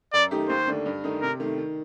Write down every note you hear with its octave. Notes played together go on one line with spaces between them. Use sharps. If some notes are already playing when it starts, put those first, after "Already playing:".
F#2 D5
D#3 A3 D#4 G4
D#2 C5
D3 A3 D4
G2
D#3 A3 D#4
C3 A#4
D#3 A3
D#3